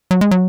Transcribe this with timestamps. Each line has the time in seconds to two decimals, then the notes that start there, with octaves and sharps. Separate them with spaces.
0.11 F#3
0.21 G#3
0.31 F#3